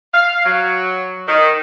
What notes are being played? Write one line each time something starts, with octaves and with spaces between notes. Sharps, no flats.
F5
F#3
D#3